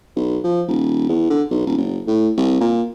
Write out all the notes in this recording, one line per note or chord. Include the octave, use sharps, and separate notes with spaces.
B1
F3
D#1
E2
D3
B1
D#1
F#1
A2
C2
A#2